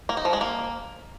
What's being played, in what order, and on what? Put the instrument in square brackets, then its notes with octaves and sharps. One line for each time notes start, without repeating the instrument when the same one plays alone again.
[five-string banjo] A#3
D#4
F3
G#3
A#3